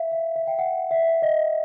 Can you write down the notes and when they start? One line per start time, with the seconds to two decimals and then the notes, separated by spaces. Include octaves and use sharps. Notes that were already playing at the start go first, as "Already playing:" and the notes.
Already playing: E5 F5
0.12 F5
0.36 E5
0.47 G5
0.59 F#5
0.91 E5
1.22 D#5